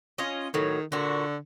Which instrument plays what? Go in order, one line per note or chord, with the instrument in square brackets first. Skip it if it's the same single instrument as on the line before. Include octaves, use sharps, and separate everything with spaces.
[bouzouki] C#4 F4 D#5
[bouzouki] A2 F#3 [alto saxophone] D#3
[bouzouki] A#2 F#4 [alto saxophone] D3